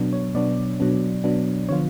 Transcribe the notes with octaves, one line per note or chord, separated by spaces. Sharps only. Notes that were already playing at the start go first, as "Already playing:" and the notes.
Already playing: B2 F#3 B3 D4
C#5
B2 F#3 B3 D4 D5
B2 F#3 B3 D4
B2 F#3 B3 D4
D3 F3 B3 F4 C#5